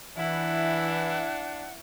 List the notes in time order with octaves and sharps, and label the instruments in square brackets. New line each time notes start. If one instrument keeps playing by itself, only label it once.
[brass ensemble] E3 [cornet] D4 [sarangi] E4 [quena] F#5